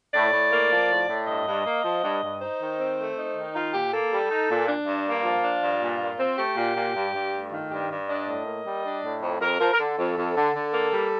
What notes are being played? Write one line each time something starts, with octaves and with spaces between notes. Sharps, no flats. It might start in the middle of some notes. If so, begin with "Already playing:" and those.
A2 D5
A2
A#3
F3
A2
A2
G2 D#5
G2
A#3
F3
G2
G2
D#4 C5
D#3
C4
A3
D#4
D#3
D#4 F4
A#2 G4
A#3 A4
G3
D#4
A#2
D4
G2
A#3
F3 F4
D4
G2
A#2
A#2
C4
A3 G4
A#2
A#2
G2
G2
A3
D#3 F4
G2 G4
G2
D4 D#5
A2
A#3
G3
D4
A2
F2
F2 A#4
F3 A#4
A#4
D3 A4
F2
F2
D3
D3
A#3
G3